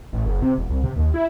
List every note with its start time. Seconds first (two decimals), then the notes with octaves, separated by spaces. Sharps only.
0.13 A1
0.26 F#1
0.42 C3
0.58 E1
0.70 C2
0.83 C3
0.96 D#2
1.14 E4